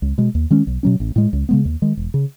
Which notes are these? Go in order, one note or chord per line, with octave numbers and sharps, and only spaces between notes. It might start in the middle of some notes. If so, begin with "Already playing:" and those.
C#2
B2 G#3
D#2
D#3 G#3 C#4
B1
B2 F#3 C#4
A1
A2 G#3
C#2
C#3 G#3 B3
D#2
D#3 G#3
E1
C#3